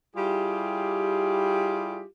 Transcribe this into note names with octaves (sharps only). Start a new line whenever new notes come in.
G3 E4 F4 G4 G#4